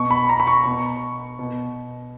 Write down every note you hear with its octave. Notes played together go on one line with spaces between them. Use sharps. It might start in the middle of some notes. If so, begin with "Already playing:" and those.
Already playing: B2 C#6
B5
A#5
B5
C#6
B2
B2